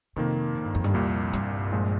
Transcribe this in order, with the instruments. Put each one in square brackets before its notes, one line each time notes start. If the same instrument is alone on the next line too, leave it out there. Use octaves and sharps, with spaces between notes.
[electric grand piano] F2 D#3 A#3 [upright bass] C3
[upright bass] A#2
G2
F2
G2
[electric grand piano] C2 A#2 G3 [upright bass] F2
[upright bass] G2
[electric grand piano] A#1 A#2 F3 G#3